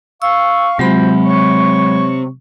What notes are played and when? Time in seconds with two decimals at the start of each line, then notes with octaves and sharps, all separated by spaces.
0.22 F5 C#6 E6
0.79 C3 F#3 G#3 F4 F#4 C5 B5
1.25 C#5 C#6